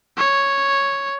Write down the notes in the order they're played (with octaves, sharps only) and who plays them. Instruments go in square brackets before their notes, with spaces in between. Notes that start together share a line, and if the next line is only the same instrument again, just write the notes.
[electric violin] C#5